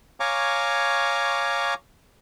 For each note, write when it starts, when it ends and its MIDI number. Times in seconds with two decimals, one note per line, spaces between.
0.20 1.74 73
0.20 1.74 77
0.20 1.74 80
0.20 1.74 82
0.20 1.74 85
0.20 1.74 86